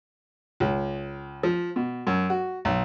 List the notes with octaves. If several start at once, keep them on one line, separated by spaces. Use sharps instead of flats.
C#2
F3
B2
F#2
F#4
B1